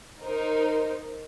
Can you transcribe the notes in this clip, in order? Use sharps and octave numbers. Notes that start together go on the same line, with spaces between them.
D#4 A#4 C5